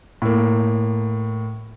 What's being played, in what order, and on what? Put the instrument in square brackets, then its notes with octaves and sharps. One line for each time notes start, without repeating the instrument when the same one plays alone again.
[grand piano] A2 A#3